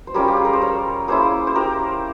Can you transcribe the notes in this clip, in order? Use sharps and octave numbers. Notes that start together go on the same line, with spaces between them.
C5
G3 C#4 F4 G4 A#4
G4
G#4
A#4
C5
A#4 C#5
A#3 C#4 E4 G#4 C5
C5
G4 A#4